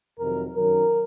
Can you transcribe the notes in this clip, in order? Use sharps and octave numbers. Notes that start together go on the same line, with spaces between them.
F2 C3 D#3 F#3 A#4
F#2 D#3 F#3 A#4